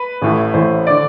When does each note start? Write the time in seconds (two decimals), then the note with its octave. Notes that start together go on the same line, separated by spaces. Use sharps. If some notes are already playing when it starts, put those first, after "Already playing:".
Already playing: B4
0.22 A1 A2 E3
0.54 A1 A2 E3 C5
0.87 D3 D5